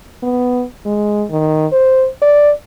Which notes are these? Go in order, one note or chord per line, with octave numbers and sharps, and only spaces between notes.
B3
G#3
D#3
C5
D5